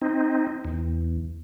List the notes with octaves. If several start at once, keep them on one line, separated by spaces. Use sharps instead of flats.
C4 D#4
E2